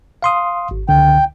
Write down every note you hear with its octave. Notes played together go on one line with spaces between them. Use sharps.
F5 C6 D#6
G#1
C#2 D3 G5